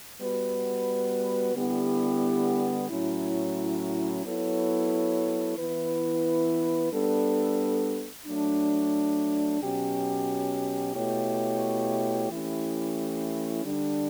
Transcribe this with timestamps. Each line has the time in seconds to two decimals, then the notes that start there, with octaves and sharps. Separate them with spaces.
0.21 G3 B3 F#4 B4
1.54 D3 G3 B3 E4 G4
2.89 A2 F#3 C#4 E4
4.24 F#3 B3 E4 A4 C#5
5.57 E3 B3 E4 B4
6.91 G3 B3 D4 A4
8.26 F#3 A3 D4
9.61 B2 F#3 C#4 G4
10.95 B2 A3 E4 G4 C#5
12.29 E3 A3 C#4 E4 G4
13.64 D3 G3 D4